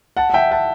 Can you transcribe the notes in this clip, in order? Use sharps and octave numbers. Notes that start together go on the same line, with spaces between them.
F#5 A5
F#5
E5 G5
F#5 A5